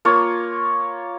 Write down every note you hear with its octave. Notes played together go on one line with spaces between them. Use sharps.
A#3 F4 C#5